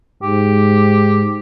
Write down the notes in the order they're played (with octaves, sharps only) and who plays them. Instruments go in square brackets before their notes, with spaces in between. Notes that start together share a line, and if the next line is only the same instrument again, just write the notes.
[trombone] G#2 [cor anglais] G4